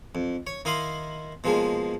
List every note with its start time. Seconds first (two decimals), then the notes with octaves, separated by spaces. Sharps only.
0.15 F2
0.47 C#5
0.65 D#3 E4 D#5 F5 B5 C6
1.44 B2 F3 G#3 A#3 G#4